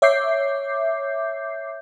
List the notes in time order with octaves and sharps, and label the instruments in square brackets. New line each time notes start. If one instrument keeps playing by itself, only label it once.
[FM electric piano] C#5 E5 D6 G6 C7